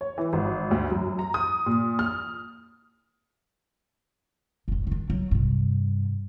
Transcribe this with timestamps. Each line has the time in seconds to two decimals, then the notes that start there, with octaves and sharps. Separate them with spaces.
0.01 C#5
0.18 E3
0.33 G#1
0.71 D2
0.91 F#2
1.19 A#5
1.34 D#6
1.66 A#2
1.99 F6
4.68 F1 A2
4.87 D#3 D4
5.10 F#3
5.31 G2 C3